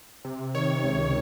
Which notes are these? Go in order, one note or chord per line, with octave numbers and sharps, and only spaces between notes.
C3
D#3 C#5
C#2